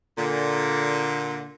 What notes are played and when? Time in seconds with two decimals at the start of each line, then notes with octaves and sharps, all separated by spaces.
0.17 A#2 D3